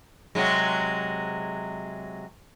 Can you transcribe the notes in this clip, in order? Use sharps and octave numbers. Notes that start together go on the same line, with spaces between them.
C3 F#3 G#3